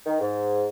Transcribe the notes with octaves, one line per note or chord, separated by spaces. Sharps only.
D#3
G#2